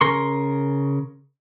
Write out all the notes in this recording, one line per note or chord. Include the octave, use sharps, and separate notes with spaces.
C#3 A#4 C6 C#6